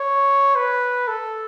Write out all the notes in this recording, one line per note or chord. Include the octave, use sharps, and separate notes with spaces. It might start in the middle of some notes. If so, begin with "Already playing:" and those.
Already playing: C#5
B4
A4